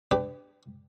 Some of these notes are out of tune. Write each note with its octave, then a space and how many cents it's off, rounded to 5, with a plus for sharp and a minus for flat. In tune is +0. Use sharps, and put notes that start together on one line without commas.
D4 +0 G4 +0 B4 +35